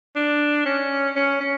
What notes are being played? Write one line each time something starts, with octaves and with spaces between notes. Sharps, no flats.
D4
C#4
C#4
C#4